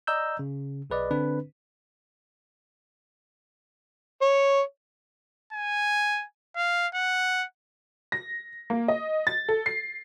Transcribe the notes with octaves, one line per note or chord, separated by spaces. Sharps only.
D5 D#5 A#5 E6 G6
C#3
B1 G#4 B4 D5 D#5
D3 C4 D4 B4
C#5
G#5
F5
F#5
A#6
A#3
D#5
A6
A4
C7